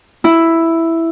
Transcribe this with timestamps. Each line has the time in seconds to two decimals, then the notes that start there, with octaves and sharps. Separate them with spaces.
0.24 E4